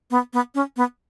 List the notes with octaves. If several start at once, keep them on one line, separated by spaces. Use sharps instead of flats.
B3
B3
C#4
B3